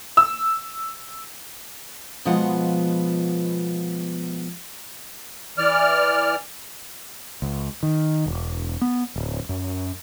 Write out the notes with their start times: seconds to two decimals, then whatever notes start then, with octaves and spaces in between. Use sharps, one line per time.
0.17 E6
2.25 B2 F3 G#3 B3 F4 F#5
5.58 E3 D5 F6
7.42 C#2
7.83 D#3
8.26 E1
8.81 B3
9.16 D1
9.49 F#2